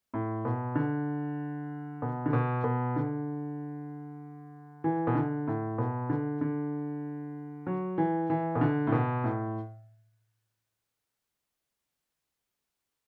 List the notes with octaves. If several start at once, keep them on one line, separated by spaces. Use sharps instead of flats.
A2
B2
D3
B2
D3
B2
B2
D3
E3
B2
D3
A2
B2
D3
D3
F#3
E3
E3
B2
D3
A2
B2
A2